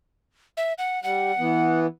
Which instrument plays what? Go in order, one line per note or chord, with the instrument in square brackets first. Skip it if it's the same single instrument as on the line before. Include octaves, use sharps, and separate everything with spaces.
[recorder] E5
F#5
[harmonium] G3 [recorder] F#5
[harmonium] E3 B3